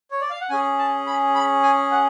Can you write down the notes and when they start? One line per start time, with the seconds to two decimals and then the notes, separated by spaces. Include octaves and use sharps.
0.11 C#5
0.21 D5
0.30 F5
0.41 F#5
0.50 C#4 G#4 G#5
0.78 A5
1.06 B5
1.35 B5
1.62 G#5
1.91 F#5